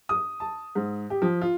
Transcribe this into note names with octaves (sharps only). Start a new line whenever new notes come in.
D#6
A5
G#2
G4
F3
F4